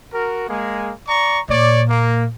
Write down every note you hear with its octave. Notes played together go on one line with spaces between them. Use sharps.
F#4 A#4
G#3 A#3 G#4
D5 A#5 C#6
A#2 C#5 D5
A#3